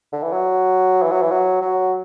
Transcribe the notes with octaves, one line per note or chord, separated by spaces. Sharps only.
D3
E3
F#3
E3
F#3
E3
F#3
F#3